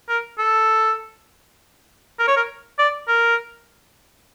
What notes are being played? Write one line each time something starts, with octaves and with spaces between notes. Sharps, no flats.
A#4
A4
A#4
C#5
A#4
D5
A#4